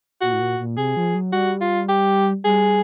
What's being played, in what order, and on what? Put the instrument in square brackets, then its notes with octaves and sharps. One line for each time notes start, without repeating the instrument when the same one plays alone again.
[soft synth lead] A#2 [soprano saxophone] F#4
[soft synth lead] A2
A#2
A#2
[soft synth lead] C3 [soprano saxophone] G#4
[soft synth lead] F3
F#3
[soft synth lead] G3 [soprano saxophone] F#4
[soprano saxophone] F4
G4
[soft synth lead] G3 [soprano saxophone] G#4